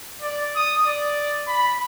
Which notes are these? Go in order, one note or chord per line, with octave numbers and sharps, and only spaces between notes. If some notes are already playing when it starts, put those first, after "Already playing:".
D5
D#6
D5
B5